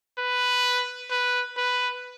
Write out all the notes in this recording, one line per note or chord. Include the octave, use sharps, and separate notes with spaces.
B4
B4
B4